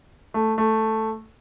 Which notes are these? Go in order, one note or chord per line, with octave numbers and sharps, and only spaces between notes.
A3
A3